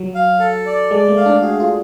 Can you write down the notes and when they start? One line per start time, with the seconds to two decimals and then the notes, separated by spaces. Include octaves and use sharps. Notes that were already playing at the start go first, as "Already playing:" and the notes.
Already playing: F#3
0.15 F5
0.40 A4
0.66 D5
0.91 G#3 D5
1.08 A3
1.17 F5
1.26 D4
1.43 F#4 G#4
1.60 F4